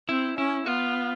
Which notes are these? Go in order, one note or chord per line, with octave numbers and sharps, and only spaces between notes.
C4 E4
C#4 E4
B3 F4